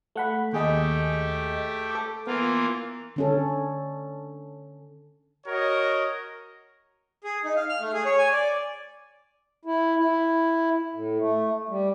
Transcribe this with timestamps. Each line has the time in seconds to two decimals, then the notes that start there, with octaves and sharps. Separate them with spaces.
0.16 A3 F#5 B5
0.53 D#2 A3 G4 G#4 D#5
1.91 A4 D6
2.27 E3 A#3 B3 F4
3.16 D3 C#4 A4
5.46 F#4 A#4 C#5 D#5
7.24 G#4
7.44 D#4
7.57 F5
7.69 F6
7.81 A3
7.93 G#4
8.05 C#5
8.18 G#5
8.32 D5
9.65 E4
9.97 E4
10.94 A2
11.19 A3
11.69 G3